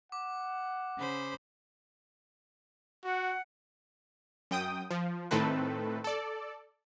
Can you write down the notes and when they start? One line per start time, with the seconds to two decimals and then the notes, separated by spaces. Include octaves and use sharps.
0.12 F#5 D6
0.97 C#3 C5 B5
3.04 F#4 F#5
4.51 F#2 G5 D#6
4.91 F3
5.31 A2 D#3 A3 C4 A4 B4
6.04 A4 D5